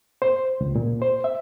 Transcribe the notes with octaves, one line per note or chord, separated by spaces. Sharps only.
C5
C#2
A#2
C5
E5